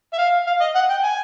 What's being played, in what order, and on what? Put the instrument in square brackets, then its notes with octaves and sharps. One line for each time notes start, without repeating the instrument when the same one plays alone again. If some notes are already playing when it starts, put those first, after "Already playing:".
[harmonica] E5
F5
F5
D#5
F#5
G5
G#5